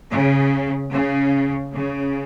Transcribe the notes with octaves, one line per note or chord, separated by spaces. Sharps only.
C#3
C#3
C#3